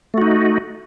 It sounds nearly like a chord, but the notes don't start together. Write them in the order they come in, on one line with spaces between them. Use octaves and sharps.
A3 F#4 D#4